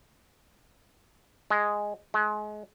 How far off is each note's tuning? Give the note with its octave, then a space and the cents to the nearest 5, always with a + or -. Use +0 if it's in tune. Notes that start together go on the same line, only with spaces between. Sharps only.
G#3 +0
G#3 +30